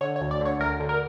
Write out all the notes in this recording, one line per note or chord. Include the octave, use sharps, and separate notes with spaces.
D3 C#5
C#5
D2
D5
D3 C#5
D2 A#4
D3
A#4